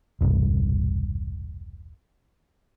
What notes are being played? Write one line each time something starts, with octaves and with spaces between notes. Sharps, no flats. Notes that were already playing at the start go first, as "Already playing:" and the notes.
E1 C2 G2